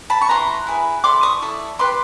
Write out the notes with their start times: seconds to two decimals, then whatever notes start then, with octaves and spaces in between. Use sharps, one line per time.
0.10 A5 B5
0.21 C#6
0.29 E4 G#4 B4 A#5 C6
0.67 E4 G#4 B4
1.04 E4 A4 D5 C6 D6
1.23 C#6 D#6
1.42 E4 A4 D5
1.79 G4 B4 D5 C6 D6